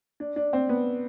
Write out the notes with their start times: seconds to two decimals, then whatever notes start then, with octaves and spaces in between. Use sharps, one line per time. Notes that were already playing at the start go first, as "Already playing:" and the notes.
0.20 D4
0.36 D4
0.53 C4
0.69 B3